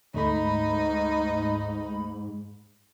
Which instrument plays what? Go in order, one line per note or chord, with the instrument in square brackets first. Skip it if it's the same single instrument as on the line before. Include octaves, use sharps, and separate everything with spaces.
[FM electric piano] D2 A3 B5 [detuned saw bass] G#2 [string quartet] D#4